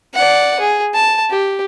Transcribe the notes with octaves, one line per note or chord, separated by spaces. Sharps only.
D5 F#5
G#4
A5
G4